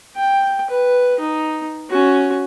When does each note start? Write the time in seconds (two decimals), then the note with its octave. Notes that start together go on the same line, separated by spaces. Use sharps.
0.16 G5
0.70 B4
1.20 D#4
1.90 C#4 F#4